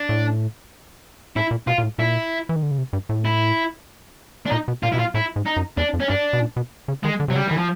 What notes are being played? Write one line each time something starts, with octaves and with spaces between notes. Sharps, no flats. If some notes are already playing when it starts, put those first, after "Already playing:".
Already playing: D4
A2
A2 E4
A#2
B2 F4
A#2
A2
A#2 E4
E3
D#3
D3
C#3
C3
G2
A2
E4
D4
A#2 D#4
B2
A#2 F4
B2 E4
A#2 F4
A2 E4
G#2
D#4
F#2
E2 D4
F2
C#4
G2 D4
B2
A#2
B2
C#3
D#3 G#3
D3
C3 F#3
C#3 G3
D#3 E3
F3